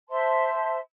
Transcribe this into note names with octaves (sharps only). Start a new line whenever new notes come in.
C5 E5 A5 C6